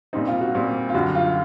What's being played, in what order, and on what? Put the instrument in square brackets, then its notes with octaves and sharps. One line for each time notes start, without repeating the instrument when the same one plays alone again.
[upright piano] A#2 G3 C4 [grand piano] D#4
[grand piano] F4
F#4
[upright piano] A#2 G3 C4
[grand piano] F4
[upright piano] F#2 D3 G3 [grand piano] F#4
[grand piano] F4